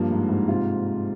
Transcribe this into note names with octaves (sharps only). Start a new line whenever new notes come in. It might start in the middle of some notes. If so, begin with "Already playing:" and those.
Already playing: G2 F3 A#3
G#2
G#2
C3 F4